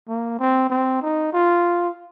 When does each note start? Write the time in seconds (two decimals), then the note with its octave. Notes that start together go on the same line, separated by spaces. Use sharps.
0.08 A#3
0.39 C4
0.70 C4
1.02 D#4
1.33 F4